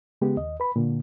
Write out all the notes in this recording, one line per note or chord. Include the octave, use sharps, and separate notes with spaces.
C#3 G#3 B3 G4
D#2 D#5
B4 B5
A#2 D3